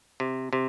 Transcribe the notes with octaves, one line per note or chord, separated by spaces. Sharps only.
C3
C3